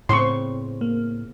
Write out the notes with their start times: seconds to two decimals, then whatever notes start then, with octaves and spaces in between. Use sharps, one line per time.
0.09 A2 C#3 B3 C4 C6 C#6
0.81 A#3